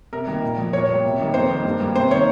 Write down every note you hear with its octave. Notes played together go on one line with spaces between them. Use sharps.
C3 A#4
D#3 G3 A#3
A#2
F3 A#3
A#2 C#5
G3 A#3
C3
D#3 G3 A#3
F2 C5
D#3 A#3
G2
G3 A#3
C3 C5
D#3 A#3 C#5